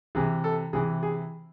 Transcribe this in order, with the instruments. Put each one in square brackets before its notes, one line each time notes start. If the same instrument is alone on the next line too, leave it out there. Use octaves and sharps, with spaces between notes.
[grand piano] C3 E3 G#4
A4
C3 E3 G#4
G#4